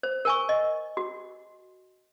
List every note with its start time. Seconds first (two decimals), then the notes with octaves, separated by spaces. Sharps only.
0.03 C5
0.25 A#4 G#5 C#6
0.49 D#5
0.97 F#4